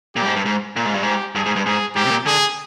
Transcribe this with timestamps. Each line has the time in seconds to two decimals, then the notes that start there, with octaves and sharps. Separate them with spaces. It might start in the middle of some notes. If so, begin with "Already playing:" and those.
0.16 A#2 G4
0.22 G2
0.26 G#2
0.36 G2
0.46 G#2
0.76 A#2 F4
0.85 G#2
0.94 G2
1.03 G#2 G4
1.35 G2 G#4
1.46 G#2
1.56 G2
1.66 G#2 G#4
1.96 G#2 G4
2.05 C3
2.11 A#2
2.26 D3 G#4